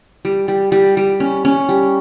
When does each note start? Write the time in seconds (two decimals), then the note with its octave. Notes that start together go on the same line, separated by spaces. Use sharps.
0.25 G3
0.48 G3
0.72 G3
0.97 G3
1.20 C#4
1.45 C#4
1.69 G3